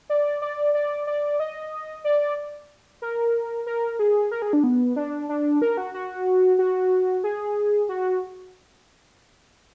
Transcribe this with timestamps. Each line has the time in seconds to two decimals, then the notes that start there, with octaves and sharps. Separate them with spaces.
0.10 D5
0.42 D5
0.74 D5
1.07 D5
1.40 D#5
2.04 D5
3.02 A#4
3.67 A#4
3.99 G#4
4.31 A#4
4.42 G#4
4.53 D4
4.64 B3
4.96 D4
5.29 D4
5.62 A#4
5.77 F#4
5.94 F#4
6.59 F#4
7.24 G#4
7.89 F#4